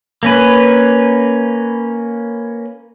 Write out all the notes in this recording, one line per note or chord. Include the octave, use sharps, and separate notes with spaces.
A#3 C#4 B4